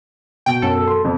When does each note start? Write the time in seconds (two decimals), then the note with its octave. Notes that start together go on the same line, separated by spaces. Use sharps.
0.46 B2 G5
0.62 F#2 A4
0.87 C6
1.04 F2 B2